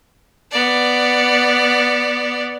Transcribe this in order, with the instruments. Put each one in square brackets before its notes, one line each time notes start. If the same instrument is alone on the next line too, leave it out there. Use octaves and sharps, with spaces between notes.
[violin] B3 D5